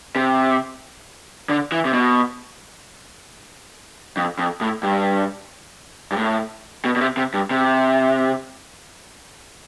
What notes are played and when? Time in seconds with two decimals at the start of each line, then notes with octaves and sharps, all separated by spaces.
0.16 C3
1.49 D3
1.72 E3
1.85 C3
1.93 B2
4.17 F2
4.38 F2
4.61 A2
4.83 G2
6.12 G2
6.17 A2
6.85 B2
6.96 B2
7.01 C3
7.17 C3
7.34 G2
7.51 C3